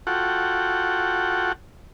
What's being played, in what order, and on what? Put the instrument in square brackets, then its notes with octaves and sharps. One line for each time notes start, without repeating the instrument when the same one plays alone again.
[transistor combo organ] F4 F#4 A4 F#5 G5